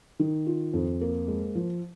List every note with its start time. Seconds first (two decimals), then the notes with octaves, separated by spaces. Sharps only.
0.20 D#3
0.47 F4
0.74 F2
1.01 A#3
1.28 G#3
1.55 F3